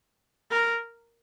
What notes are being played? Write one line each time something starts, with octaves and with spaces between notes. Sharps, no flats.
A#4